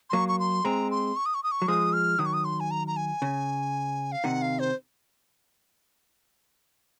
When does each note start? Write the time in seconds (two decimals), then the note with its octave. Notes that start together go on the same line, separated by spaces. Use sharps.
0.10 C6
0.13 F#3 A#3 C#6
0.29 C#6
0.39 C6
0.65 G#3 C4 A#5
0.91 C6
1.16 C#6
1.26 D#6
1.34 C#6
1.43 D#6
1.51 C#6
1.62 F#3
1.68 F3 G#3 D#6
1.93 F6
2.19 D#3 F#3 D#6
2.26 C#6
2.33 D#6
2.45 C6
2.60 G#5
2.71 A#5
2.87 A#5
2.96 G#5
3.22 C#3
4.12 F5
4.24 C3 D#3 F#5
4.42 F5
4.59 C5